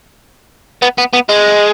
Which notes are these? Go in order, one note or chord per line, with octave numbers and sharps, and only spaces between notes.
B3
B3
B3
G#3